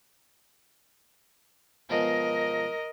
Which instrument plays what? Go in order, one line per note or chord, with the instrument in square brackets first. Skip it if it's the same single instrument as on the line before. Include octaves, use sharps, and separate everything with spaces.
[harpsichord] B2 F3 G#3 [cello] A#4 D#5